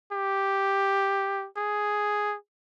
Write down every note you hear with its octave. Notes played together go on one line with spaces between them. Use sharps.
G4
G#4